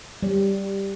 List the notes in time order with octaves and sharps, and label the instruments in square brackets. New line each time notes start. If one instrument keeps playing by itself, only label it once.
[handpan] G3